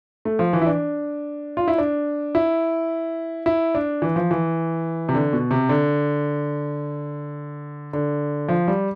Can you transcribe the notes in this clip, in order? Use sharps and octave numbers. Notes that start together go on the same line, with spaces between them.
A3
F3
E3
E4
D4
F4
E4
D4
E4
E4
D4
E3
F3
E3
C3
D3
B2
C3
D3
D3
F3
G3